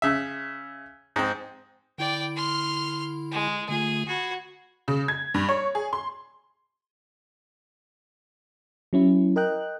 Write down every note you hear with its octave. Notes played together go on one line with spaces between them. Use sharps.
C#3 E5
G#2 C4
D3 E4 D5 G5
C6 F6
G#3
D3 A3 F4 G#4
F#4 B5 G#6 C7
C#3
G#6
G2
C#5
G#4
C6
F#3 C#4 E4
A#4 D#5 G5 F#6